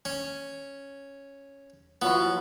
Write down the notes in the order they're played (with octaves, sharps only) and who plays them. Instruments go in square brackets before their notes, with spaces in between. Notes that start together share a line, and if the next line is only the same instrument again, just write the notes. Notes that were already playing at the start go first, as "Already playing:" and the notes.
[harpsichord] C#4
[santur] F3 F#3 E4 [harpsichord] B3